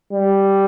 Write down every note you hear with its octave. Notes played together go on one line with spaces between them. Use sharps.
G3